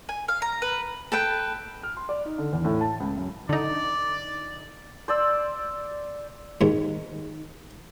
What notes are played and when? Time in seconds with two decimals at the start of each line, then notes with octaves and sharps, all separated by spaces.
0.09 G#5
0.28 F5
0.42 A#5
0.62 B4
1.12 A4 B4 G5
1.83 F6
1.97 C6
2.09 D5
2.25 D#4
2.38 D3
2.53 E2
2.65 A2
2.81 A5
3.00 C#2
3.17 F#2
3.49 D3 D#4 D5
5.08 C5 D5 E6
6.61 D#2 G#2 D#3